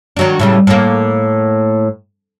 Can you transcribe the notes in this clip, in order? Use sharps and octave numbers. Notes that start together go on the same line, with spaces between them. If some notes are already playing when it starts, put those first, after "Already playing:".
D#3 F#3 D4
A2 C#3 G3
A2 A#3